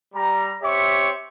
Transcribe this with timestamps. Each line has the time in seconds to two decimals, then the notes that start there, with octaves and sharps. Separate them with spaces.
0.14 G3 A#5
0.62 C4 G4 C#5 E5 C#6